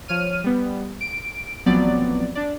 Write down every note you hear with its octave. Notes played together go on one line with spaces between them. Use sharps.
F3 C#5 F6 D#7
G3 B3
D7
A1 F3 F#3 B3 C4 D5
D4 D5